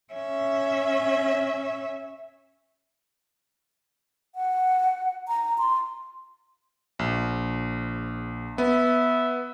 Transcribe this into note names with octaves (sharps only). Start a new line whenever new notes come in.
C#4 E5
F#5
A#5
C6
A#1
B3 E5